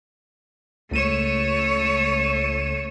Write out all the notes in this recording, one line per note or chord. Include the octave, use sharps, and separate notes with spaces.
C#2 A3 C#5 D#7 E7